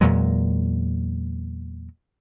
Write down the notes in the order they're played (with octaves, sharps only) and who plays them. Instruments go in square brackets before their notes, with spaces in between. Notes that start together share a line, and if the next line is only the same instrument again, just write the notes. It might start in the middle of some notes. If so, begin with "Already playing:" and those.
[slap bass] E2 A#2 F#3 G#3